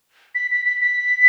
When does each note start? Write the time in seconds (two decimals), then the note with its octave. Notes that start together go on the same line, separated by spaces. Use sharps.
0.35 B6
0.51 B6
0.66 B6
0.81 B6